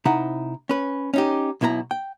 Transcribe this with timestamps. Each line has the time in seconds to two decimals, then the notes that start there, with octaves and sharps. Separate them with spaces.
0.05 C3 D#4 E4 F#5
0.69 C#4 B4
1.14 C#4 D#4 G4
1.61 B1 B2 E4 A#4 A#5
1.91 G5